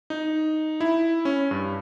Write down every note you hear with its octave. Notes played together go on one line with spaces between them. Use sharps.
D#4
E4
C#4
G2